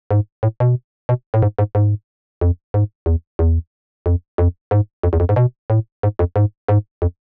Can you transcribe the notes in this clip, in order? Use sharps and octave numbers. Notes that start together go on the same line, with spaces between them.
G#2
A2
B2
B2
A2
G#2
G#2
G#2
F2
G#2
E2
E2
F2
F2
G#2
F2
E2
F2
G#2
B2
A2
G#2
F2
G#2
G#2
F2